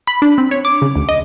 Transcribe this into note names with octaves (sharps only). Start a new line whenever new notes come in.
B5
D4
C4
C#5
D6
C#3
D2
D#5